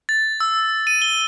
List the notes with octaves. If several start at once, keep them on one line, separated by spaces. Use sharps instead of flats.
A6
E6
D#7
G7